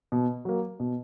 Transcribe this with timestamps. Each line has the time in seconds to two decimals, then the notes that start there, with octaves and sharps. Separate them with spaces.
0.12 B2
0.45 F#3 A#3
0.80 B2